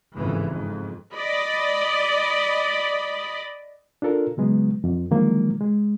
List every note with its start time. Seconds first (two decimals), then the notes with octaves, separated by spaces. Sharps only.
0.14 G1 F2 G#2 C#3 E3
0.44 F2 G#2
1.14 D5 D#5 B5
4.02 D4 F4 A4 A#4
4.37 C#3 F#3 G#3 B3
4.84 F2
5.11 D3 D#3 F3 F#3 G#3 A#3
5.60 G#3